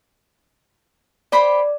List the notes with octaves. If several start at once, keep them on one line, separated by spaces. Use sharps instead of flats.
G4 C5 D5 B5